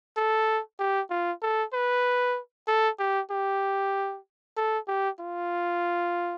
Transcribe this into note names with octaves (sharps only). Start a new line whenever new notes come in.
A4
G4
F4
A4
B4
A4
G4
G4
A4
G4
F4